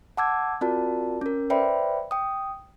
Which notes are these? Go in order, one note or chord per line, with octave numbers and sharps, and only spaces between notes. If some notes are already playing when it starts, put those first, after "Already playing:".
F#5 A5 D6 E6 G#6
C4 F4 F#4 A#4 D5 A5
C#4 A#4
B4 C5 D5 E5 G5 B5
G5 D#6